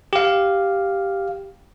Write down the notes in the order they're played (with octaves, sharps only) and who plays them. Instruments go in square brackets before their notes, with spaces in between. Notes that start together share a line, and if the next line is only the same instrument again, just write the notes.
[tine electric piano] G4 F5